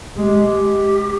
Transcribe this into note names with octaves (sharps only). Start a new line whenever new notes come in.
G#3 G4